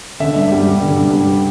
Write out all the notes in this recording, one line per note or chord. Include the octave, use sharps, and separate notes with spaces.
D3 E5
G2
G3
G2
D3
G2
G3